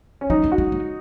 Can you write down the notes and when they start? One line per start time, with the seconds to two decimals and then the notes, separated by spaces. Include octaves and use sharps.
0.21 C#4
0.30 F#3 D#4
0.44 G#3
0.52 F#4
0.58 G#3
0.72 G#3